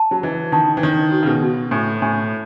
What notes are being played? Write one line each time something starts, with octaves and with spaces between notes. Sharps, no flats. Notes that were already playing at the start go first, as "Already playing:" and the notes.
Already playing: A5
F#3
E3 D#5
D#3 A5
E3
D#3 C#5
F#4
C#3
B2
F#4
A2 G#5
A2 G#5